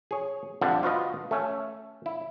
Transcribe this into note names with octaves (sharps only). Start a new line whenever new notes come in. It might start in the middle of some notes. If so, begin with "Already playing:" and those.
G#4 C#5
F2 D3 G3
F4 F#4 B4 D#5
A3 C#4
E4